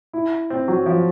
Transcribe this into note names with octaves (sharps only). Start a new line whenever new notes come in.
E4
C4
F#3
F3